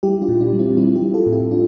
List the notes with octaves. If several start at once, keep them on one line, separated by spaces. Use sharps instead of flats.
G3 E4 G4
D4 F4
A#2
D4
G3
C4 E4
G3 C4 E4
E4 G4
G3
F4 A4
A2
E4 G4
D4 F4